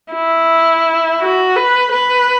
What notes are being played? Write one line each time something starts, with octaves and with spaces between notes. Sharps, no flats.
E4
F#4
B4
B4